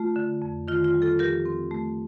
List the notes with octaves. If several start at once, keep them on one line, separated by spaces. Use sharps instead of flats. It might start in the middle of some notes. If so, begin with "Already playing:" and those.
Already playing: A3 F4
D3
F2
D#3 F4
F4
G3
F4 A4
F3 G4 A#4
C4
A3